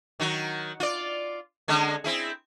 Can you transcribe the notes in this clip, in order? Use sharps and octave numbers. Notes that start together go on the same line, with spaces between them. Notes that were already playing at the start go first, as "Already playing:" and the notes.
D#3 F#3 F#4
F4 D5
D3 G#3 C#4
C4 E4 G#4